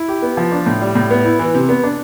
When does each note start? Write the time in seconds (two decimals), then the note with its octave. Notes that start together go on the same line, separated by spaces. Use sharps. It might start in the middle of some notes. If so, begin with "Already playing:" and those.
Already playing: E4
0.08 G4
0.22 B3
0.37 F3
0.52 D4
0.66 A2
0.81 G3
0.95 A2
1.10 B3
1.25 E4
1.39 E3
1.54 C3
1.69 B3
1.84 D4